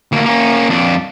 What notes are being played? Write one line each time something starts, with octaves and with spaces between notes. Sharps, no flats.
D2 A#3
A#3 C#4
F2 D4